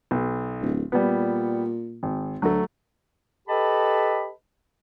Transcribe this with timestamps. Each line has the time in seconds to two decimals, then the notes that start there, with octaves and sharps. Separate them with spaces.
0.11 B1
0.61 D1
0.92 A#2 G3 B3
2.03 G#1
2.42 D2 F#3 A3
3.48 G4 A4 B4 D#5 A5 B5